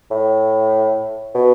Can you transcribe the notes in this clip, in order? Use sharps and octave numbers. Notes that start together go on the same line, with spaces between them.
A2
B2